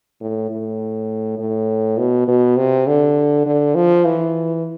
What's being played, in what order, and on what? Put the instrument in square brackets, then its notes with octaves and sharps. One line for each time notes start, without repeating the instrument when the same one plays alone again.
[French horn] A2
A2
A2
B2
B2
C3
D3
D3
F3
E3